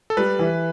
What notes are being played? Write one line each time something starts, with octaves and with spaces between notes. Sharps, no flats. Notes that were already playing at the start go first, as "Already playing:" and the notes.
A4
G3 B4
E3